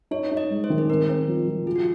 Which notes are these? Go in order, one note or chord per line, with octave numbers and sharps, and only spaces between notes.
D#4 C#5
D#4
D#5
G#3
C5
D#3
G#4
C4 A#4
C4
F3
F3
F4 G#4
F#4